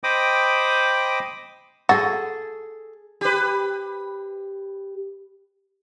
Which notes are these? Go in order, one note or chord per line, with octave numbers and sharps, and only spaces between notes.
C5 D#5 G5 B5 D6 D#6
F#4 G#4 A4
G4 B4